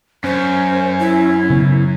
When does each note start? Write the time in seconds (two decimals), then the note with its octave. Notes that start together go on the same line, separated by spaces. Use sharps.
0.24 F#2 C#4 C5
0.99 E4
1.50 C#3 B3